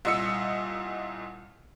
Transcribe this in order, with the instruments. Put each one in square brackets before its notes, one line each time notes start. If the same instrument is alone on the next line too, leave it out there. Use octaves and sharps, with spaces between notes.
[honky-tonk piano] C2 A#2 D#5 E6 C#7